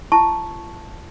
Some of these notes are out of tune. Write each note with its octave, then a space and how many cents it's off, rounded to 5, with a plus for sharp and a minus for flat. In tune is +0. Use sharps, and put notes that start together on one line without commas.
F4 -40 A5 -5 C#6 +0